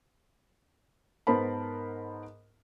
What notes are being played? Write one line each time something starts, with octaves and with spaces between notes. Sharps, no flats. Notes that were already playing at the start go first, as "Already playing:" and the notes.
G#2 B3 A#4 C5 A5 B5